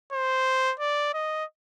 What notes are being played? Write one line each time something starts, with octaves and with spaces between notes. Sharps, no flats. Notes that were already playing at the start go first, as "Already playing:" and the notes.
C5
D5
D#5